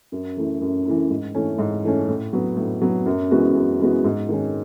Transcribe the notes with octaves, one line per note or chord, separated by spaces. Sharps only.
F#2
E3 A3 E4
F#2
E3 A3 E4
G#2
E3 A3 C#4
G#2
E3 A3 C#4
A2
F#3 B3
A2
F#3 B3
F#2
E3 G#3 B3 F#4
F#2
E3 G#3 B3 F#4
G#2
D#3 G#3 C#4